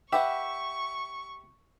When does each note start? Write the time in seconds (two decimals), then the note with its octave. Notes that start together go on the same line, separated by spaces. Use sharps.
0.13 G4 B4 E5 F#5 C#6